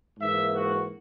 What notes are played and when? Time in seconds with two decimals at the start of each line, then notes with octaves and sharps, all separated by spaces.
0.19 G#2 E3 A#3 E5
0.53 F#4